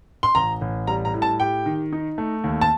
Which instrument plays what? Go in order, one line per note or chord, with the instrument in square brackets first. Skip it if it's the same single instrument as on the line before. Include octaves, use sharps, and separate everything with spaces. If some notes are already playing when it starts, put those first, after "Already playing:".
[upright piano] C6
[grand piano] A1 [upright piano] A#5
[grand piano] A1
[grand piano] G3 [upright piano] A#5
[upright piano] A#5
[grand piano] A2
[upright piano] A5
[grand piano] G4 [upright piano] G5
[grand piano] D#3
D#4
A3
D#2
[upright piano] A5